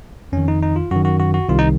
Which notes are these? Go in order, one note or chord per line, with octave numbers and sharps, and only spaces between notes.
F2 D#3 C#4
D#4
D#4
F4
F#2 D#3 F#4
F#4
F#4
F#4
C2 C3 D#3 F4
D#4